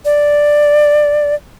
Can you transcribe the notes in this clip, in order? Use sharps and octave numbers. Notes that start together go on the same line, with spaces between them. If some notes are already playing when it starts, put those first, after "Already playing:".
D5